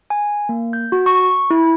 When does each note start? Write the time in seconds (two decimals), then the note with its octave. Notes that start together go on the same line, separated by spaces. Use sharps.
0.10 G#5
0.49 A#3
0.73 G6
0.92 F#4
1.06 C#6
1.51 E4